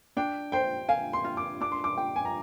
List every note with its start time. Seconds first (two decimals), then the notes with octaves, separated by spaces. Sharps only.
0.17 D4 G5
0.52 C5 G5
0.89 F5 G#5
1.13 C6
1.24 F4
1.37 D6
1.61 D4 D6
1.72 C6
1.84 D6
1.97 G5
2.16 G#5
2.25 A#5